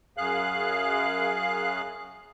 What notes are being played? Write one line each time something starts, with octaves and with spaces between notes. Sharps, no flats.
F#2 G#4 F5 F#6